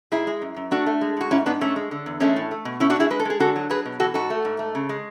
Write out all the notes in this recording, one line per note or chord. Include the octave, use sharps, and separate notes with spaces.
G#2 E4 G#4
G#3
F#2
F#2
A3 D4 F#4
A3
G#3
A2 F#4
G#2 C#4 E4
G#2 B3 D4
G#2 A3 C#4
G#3
D3
E2
G#3 A3 C#4
A2
A3
B2
A3 C#4 E4
D4 F#4
A2 E4 G#4
G#3 B4
A4
G#3 G#4
D3 F#4 A4
F#3
F#3 G#4 B4
B2
E3 F#4 A4
G#2 F#4 A4
A3
G#2
A3
C#3
G#3